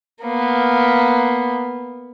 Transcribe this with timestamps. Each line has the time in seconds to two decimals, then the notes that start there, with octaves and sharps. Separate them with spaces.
0.24 A#3 B3